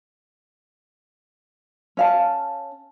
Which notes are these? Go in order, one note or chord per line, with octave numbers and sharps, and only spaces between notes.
C#4 F5 A5